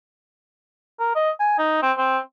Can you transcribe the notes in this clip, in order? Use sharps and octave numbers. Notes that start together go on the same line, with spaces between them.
A#4
D#5
G#5
D#4
C4
C4